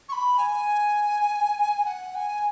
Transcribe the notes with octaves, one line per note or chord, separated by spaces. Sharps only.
C#6
B5
G#5
F#5
G#5